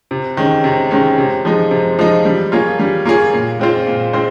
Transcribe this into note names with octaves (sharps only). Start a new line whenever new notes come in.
C3
D#3 G#3 C#4
C3
D#3 G#3 C#4
C3
F3 G#3 D#4
C3
F3 G#3 D#4
G3
A#3 F4 G#4 C#5
G3
A#3 F4 G#4 C#5
A#2
G#3 C4 F4 C5
A#2
G#3 C4 F4 C5